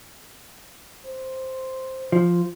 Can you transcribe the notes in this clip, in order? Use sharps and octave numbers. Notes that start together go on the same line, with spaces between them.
C5
F3